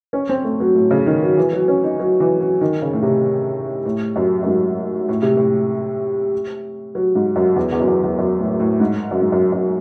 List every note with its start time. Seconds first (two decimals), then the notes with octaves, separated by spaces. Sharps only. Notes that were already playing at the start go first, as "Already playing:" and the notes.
0.13 C#4
0.29 C4
0.45 A3
0.60 F#3
0.75 A2
0.91 C#3
1.06 D#3
1.22 F#3
1.37 E3
1.53 F#3
1.68 C#4
1.84 D#4
1.99 F#3
2.20 E3
2.40 F#3
2.61 D#3
2.82 C#3
2.93 A2
3.02 C3
3.85 A2
4.16 F#2
4.43 F#2
4.47 G#2
5.09 A2
5.22 C3
5.37 A2
6.95 F#3
7.15 G#2
7.36 F#2
7.56 E2
7.72 E2
7.80 F#2
7.87 E2
8.03 E2
8.19 F#2
8.39 A2
8.60 A2
8.80 G#2
9.11 F#2
9.22 G#2
9.32 F#2
9.52 F#2